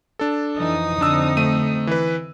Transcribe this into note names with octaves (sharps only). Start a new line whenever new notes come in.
D4 A4
F2 E3 D#4 D#6
D3 C4 D4 E6
A3 D#7
E3 B4